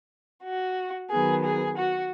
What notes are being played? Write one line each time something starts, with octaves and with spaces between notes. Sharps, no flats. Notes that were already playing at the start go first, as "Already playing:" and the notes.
F#4
D#3 F#3 B3 G#4
G#4
F#4